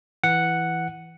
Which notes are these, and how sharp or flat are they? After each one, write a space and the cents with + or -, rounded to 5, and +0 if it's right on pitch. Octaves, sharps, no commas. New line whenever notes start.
E3 +5 F#5 +0